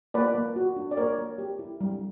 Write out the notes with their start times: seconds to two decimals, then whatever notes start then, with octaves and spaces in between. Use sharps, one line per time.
0.14 A#3 B4 D5
0.35 A#3
0.56 F#4
0.77 D4
0.91 D5
0.97 A#3 A#4 C#5
1.18 A#3
1.38 G4
1.59 E4
1.81 G3